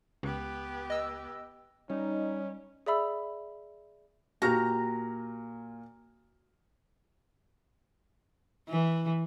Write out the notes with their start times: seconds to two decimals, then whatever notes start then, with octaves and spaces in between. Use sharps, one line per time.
0.23 C#2 B3 G4
0.90 D#5 E6
1.90 G3 C#4 D#4
2.86 G#4 D5 E5 B5 E6
4.42 A#2 F#4 G4 A#5 F6 A#6
8.69 E3